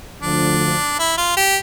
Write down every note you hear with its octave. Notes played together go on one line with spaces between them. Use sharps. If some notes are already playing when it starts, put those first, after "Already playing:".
D2 D3 F3 D4
E4
F4
G4